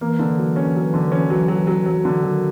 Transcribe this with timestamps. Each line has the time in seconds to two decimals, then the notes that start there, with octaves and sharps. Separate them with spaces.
0.01 E3 A#3
0.19 D3
0.38 F#3
0.56 C#4
0.75 F#3
0.94 D3
1.12 C#4
1.30 F#3
1.48 F#3
1.67 F#3
1.86 F#3
2.05 D3
2.23 D#3 F#3